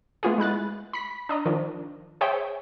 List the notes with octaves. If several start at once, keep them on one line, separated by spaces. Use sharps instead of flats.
A3 B3 F4 F#4 G#4
G#3 E4 F#6 A6
B5 B6
D4 D#5 A#5
D#3 F3 D4
G#4 C5 C#5 E5 G5